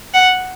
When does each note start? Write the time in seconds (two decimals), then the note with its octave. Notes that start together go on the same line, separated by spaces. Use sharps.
0.14 F#5